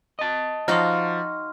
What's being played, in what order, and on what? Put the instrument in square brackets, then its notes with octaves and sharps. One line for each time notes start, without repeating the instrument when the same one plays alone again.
[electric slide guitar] D#5 A5
[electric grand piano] F3 [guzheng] D#4 F#4 F5 [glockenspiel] C6 F6